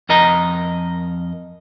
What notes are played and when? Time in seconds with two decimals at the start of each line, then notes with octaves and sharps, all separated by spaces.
0.09 F2 A#4 D#5 A#5